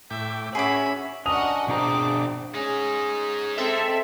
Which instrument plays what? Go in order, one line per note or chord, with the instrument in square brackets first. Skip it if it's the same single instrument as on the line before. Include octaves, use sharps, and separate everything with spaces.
[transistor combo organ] A2 G5 D6 [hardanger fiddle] E5
[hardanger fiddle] C#4 F#4 [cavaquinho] G#4 D6 [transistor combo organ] C#5 [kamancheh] E5 B5
[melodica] C#4 D4 A#4 [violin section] F#4 D#5 F#5 [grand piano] D#6 F7
[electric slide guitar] B2 D4 A#5 [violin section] C4 D6 [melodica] G#4
[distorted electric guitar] G#3 D#4 [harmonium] C#4 G#4
[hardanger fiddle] C4 [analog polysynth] A4 E5